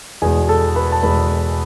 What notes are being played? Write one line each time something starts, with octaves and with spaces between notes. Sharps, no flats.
E2 B2 G#3 G#4 G#5
A4 A5
B4 B5
A5
E2 B2 G#3 B4 B5